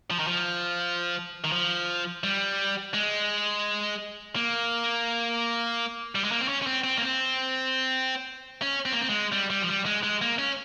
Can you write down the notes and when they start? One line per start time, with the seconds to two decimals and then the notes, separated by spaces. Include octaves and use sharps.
0.10 F3
0.19 D#3
0.27 F3
1.44 D#3
1.52 F3
2.24 G3
2.94 G#3
4.36 A#3
6.15 G3
6.24 G#3
6.32 A#3
6.41 C4
6.48 C#4
6.62 C#4
6.67 C4
6.84 C4
6.98 A#3
7.02 C4
8.62 C#4
8.85 C4
8.93 A#3
9.01 C4
9.09 G#3
9.32 G3
9.50 G3
9.62 F3
9.68 G3
9.86 G#3
10.03 G#3
10.22 A#3
10.38 C#4